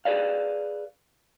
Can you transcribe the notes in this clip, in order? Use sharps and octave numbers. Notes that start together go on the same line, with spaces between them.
G#4 B4 D5 F5